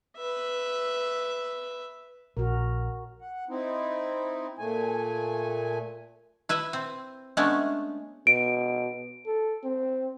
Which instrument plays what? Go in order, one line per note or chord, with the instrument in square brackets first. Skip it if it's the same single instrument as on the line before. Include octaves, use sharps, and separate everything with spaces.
[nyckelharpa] B4 E5
[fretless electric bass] A#1 [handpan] F#4 A#4
[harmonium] F#5
C4 D#4 E4
A#2 A3 G#5
[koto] E4 B4 E5
C4
G#3 A3 B3 C#4 D4
[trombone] B2 [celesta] D7
[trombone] A4
C4